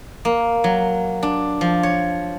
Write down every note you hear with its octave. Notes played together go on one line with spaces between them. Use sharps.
A#3
F#3
D4
F3
C#5